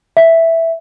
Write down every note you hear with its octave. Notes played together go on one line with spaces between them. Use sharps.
E5